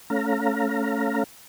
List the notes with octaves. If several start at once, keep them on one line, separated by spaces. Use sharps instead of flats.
A3 C#4 F5 A#5